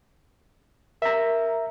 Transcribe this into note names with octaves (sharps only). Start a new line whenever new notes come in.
A#4 E5 A#5